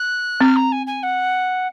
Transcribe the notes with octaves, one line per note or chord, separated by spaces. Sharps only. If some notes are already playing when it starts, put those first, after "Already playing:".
Already playing: F#6
C4 F6
A#5
G#5
G#5
F#5